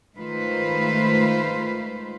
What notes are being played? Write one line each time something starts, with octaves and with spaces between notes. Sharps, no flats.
D#3 G#3 A3 F4 B4 C5